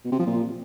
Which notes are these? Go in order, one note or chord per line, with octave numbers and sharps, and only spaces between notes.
B2
C3
F3
A#2